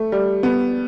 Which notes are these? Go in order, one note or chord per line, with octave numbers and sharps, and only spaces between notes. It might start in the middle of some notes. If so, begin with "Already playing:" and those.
Already playing: A3
G3
B3